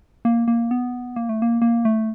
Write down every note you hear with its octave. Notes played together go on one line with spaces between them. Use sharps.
A#3
A#3
B3
A#3
A3
A#3
A#3
A3